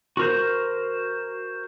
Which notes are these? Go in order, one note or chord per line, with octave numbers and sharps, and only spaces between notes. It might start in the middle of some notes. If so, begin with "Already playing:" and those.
F#4 A#4 C5